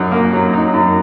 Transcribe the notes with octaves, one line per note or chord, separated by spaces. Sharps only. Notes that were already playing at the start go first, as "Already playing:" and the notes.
Already playing: F#2 D#4
A#3
F#3
D#4
F#2